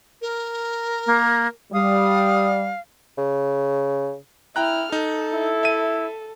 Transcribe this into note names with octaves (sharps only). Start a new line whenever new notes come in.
A#4
A#3
G3 F5 D#6
C#3
E4 G5 A#5 F6 F#6
D#4 A4
E4
E5 D#7